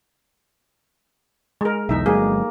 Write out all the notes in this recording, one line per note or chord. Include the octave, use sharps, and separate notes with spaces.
G#3 A#4
B1 E2 D#4 E5
G1 F#3 G#3 A#3 G#4